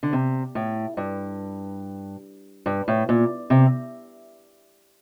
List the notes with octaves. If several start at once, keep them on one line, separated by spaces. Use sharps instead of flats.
D3
C3
A2
G2
G2
A2
A#2
C3